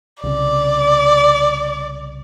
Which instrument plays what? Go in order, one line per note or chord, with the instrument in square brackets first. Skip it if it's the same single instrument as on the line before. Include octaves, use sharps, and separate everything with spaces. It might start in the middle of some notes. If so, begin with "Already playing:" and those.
[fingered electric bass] C2 C#3 [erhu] D5